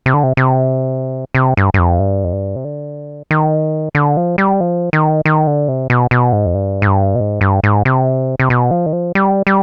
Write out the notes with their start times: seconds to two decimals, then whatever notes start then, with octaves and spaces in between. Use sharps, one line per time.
0.06 C3
0.14 D3
0.23 C3
0.37 C3
1.35 C3
1.57 G2
1.74 G2
1.79 F2
1.99 G2
2.24 F2
2.33 G2
2.56 C3
2.64 D3
3.31 D#3
3.95 D3
4.17 F3
4.38 G3
4.61 F3
4.93 D#3
5.25 D#3
5.47 D3
5.68 C3
5.90 B2
6.11 B2
6.33 G#2
6.46 F2
6.55 G2
6.82 G#2
6.87 G2
7.15 B2
7.20 G#2
7.41 G2
7.64 G#2
7.85 C3
8.40 C3
8.50 B2
8.71 F3
8.86 D#3
8.93 F3
9.15 G3
9.47 G3